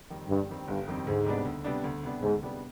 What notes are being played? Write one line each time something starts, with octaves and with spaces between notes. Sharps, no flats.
F2 D#3 G3 C4
G1 G2
F2 D#3 G3 C4
G1 G2
F2 D#3 G3 C4
D2 G#2
C3 G3 B3 D4
D2
C3 G3 B3 D4
D2
C3 G3 B3 D4
D2 G#2
C3 G3 B3 D4